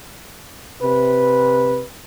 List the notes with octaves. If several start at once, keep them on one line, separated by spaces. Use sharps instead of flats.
C3 B4